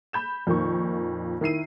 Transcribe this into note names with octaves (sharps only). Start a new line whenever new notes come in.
B5 G6 E7
F2 A#2 D#3 C#6
D#3 E4 C7 D#7